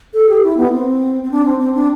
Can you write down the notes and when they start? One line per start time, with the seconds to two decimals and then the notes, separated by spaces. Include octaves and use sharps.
0.14 A4
0.29 G4
0.44 E4
0.57 B3
0.72 C4
1.23 C4
1.31 D4
1.45 C4
1.59 C4
1.75 D4